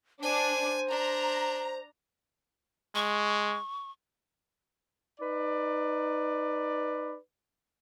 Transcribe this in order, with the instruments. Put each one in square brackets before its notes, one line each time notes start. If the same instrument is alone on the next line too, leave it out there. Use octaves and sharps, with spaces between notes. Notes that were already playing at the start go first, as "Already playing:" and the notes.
[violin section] D4 [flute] C5 [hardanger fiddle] G#5
[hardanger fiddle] D4 [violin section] A#5
[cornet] G#3 [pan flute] C#6
[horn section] D#4 B4 D5